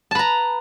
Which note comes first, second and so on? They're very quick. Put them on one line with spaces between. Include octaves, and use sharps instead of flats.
A5 B4 A#5